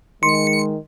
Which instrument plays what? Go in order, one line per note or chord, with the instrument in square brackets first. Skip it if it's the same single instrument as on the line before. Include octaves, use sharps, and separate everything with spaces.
[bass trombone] D#3 [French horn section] G#3 [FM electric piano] C6 [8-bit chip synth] C#7